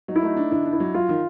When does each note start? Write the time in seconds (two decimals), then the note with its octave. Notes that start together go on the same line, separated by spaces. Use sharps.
0.08 F#3 D#4
0.15 E4
0.22 A3 D#4
0.37 D4
0.51 D3 E4
0.66 D4
0.73 E4
0.80 F#3
0.94 F#3 F4
1.09 D#3